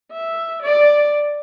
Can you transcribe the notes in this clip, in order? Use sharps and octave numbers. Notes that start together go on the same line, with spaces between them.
E5
D5